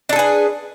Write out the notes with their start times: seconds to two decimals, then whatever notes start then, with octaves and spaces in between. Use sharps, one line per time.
0.09 D4
0.13 A4
0.16 G#4
0.19 B4